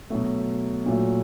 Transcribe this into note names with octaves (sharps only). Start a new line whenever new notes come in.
B2 F#3 A3
A#2 F#3 A3